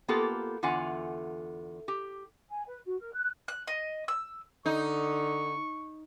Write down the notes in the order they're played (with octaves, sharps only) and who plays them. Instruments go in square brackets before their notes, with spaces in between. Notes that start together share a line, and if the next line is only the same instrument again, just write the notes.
[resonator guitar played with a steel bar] A#3 B3 F4 G4 A4
E2 D3 F4 F#5 G#5
G4
[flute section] G#5
B4
F#4
A#4
F#6
[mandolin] F#6
D#5
E6
[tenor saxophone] D3 [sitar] D#4 [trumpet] C#6